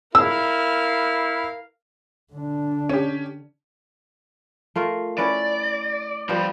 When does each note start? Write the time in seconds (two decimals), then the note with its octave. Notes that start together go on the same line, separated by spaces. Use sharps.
0.15 E4 A#4 F5 E6
2.33 D3 D4
2.89 C#4 G4
4.76 A3 F4 A#4
5.18 C#4 E4 B4 D5
6.29 D3 F3 G3 B3 C5